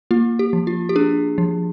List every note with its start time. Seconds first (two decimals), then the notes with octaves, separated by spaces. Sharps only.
0.11 A#3 F4
0.39 G4
0.53 F3
0.67 F4
0.89 G4
0.96 D4 G#4
1.38 F3